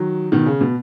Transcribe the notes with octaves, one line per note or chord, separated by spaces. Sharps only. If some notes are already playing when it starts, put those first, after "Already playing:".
Already playing: D#3 F#3
B2 D#3
C#3
B2